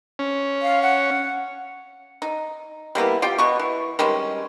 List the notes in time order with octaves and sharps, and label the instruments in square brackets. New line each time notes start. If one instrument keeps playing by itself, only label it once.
[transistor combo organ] C#4
[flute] F5
F#5
[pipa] D#4
G3 A#3 B3 E4
F4 G4 G5
B2 B3 C#6
E3
D#3 G3 G#3 C#4